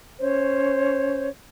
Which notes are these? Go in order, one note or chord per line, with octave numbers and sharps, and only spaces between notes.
C#4 C5 C#5